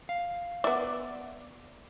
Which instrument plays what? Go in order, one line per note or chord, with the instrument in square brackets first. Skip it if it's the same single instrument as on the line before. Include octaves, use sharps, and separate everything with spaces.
[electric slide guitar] F5
[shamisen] B3 E5 [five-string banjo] D5